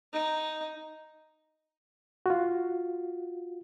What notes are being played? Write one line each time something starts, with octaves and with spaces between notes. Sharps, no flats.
D#4
F4 F#4